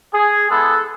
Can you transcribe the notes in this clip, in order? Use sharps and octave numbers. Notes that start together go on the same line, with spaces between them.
G#4
G#3 B3 E4 A4